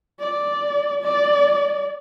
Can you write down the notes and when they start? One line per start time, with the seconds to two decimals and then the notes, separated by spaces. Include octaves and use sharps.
0.20 D5
1.02 D5